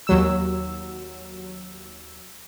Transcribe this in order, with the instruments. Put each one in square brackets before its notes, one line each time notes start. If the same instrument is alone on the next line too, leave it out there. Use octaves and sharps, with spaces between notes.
[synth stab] D#2 F#3 E6